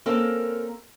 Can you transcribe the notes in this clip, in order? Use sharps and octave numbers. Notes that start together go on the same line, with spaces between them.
A#3 C4 C#4 A4 A#4